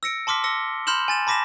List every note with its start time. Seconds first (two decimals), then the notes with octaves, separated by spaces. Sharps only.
0.03 E6 A#6 C#7 D7
0.27 A5 C6 D6 F6 B6
0.44 E6 A#6 C#7 G7
0.87 B5 C6 F6 G6 E7 F#7
1.08 G#5 A6 E7
1.27 A5 B5 D6 A#6 B6 E7